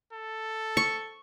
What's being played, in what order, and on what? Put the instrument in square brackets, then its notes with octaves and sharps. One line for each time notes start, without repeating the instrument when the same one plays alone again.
[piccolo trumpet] A4
[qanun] C#6